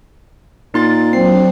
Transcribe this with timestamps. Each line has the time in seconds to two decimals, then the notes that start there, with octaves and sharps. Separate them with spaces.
0.74 A#2 D#4 C6 A6
1.13 F#3 C4 D4 C7